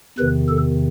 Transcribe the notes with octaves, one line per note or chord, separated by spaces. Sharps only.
E2 C3 D#3 B4
A4